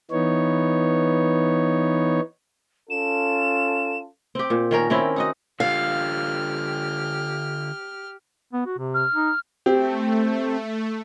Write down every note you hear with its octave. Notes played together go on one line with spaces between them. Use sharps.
E3 B3 D#4 C#5
C#4 F4 A4 E7
C4 G4
A#2
D#3 C#4 A#4
D#3 C4 C#4 E4
D#4 F#4 D#5
D3 F4 G4 F5 F6
B3
F#4
C3
F6
D#4
A3 C4 G4